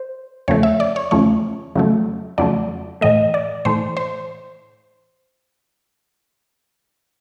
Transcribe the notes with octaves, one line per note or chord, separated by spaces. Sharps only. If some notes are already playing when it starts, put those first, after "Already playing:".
Already playing: C5
E2 C#3 F3 A3 C#5
E5
D5
C#5
E2 C#3 F3 A3 C#5
F2 C#3 F#3 A3
F2 C#3 F#3 A3 D5
A2 E3 A3 D#5
D5
A2 E3 A3 C5
C5